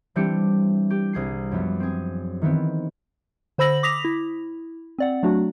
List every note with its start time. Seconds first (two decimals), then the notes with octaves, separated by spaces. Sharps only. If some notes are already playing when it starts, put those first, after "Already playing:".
0.16 E3 G3 C4 D4 G4 C#7
0.90 G4
1.13 C2 G#4 C7
1.51 F#2 F3 B3
1.80 C4 G#4
2.42 D#3 E3 B3 C4
3.58 D3 C5 B5 E6 A#6 F#7
3.83 D6 D#6 A#6 B6 F7
4.05 E4
4.99 C4 D5 F#5
5.23 F#3 A3 D4 F#4